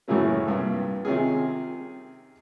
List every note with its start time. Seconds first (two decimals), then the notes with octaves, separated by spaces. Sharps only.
0.08 F#2 A2 C#3 E3 F#3 A#3
0.48 C2 G2 A#2
1.05 C3 D#3 C#4 F4 G#4